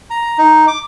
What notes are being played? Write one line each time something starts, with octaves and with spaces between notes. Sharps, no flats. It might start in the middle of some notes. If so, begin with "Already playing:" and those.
A#5
D#4
D6